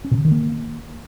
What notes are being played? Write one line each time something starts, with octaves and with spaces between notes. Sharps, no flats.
C#4
B2
D3
D#3
A#3